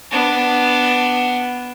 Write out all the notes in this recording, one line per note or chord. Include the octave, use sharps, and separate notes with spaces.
B3 D4